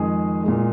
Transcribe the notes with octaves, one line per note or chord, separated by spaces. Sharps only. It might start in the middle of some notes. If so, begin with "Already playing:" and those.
Already playing: F2 D#3 G#3 G#4
A#2 G#3